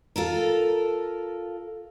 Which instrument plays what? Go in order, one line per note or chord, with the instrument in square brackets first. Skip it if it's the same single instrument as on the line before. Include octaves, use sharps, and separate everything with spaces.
[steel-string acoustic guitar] F4 A4 A#4